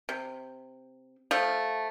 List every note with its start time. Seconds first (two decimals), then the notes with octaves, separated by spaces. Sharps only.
0.09 C3
1.31 F3 A3